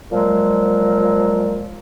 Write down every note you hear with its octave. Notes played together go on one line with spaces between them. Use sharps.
A#2 F3 F#3 G#3